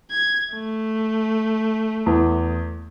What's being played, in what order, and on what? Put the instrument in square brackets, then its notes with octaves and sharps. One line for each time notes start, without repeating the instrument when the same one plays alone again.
[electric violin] G#6
A3
[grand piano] E2